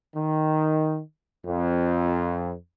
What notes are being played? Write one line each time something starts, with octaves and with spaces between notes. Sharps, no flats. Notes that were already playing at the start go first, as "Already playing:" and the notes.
D#3
F2